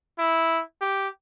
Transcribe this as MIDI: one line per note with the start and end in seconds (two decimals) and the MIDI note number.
0.19 0.61 64
0.81 1.08 67